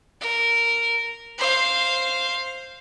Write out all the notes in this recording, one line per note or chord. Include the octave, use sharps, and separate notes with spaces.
A#4
C5 F5